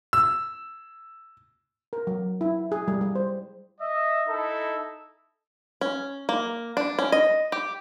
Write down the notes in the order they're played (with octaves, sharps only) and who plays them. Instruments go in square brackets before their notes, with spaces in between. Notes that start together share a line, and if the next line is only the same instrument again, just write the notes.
[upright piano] E6
[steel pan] A#4
F#3
E4
G#4
G3
G3
C5
[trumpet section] D#5 E5
D#4 E4 A4
[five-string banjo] C#4
A#3
D4
C#4
D#5
G4